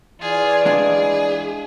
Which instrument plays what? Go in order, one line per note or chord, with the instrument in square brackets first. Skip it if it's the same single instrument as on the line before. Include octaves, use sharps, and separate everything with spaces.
[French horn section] E3 D5 [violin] F4 G#4
[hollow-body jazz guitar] G#3 D4 F4 [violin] G#4